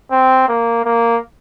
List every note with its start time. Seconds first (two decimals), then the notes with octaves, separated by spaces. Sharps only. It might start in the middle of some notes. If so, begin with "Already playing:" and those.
0.11 C4
0.49 A#3
0.85 A#3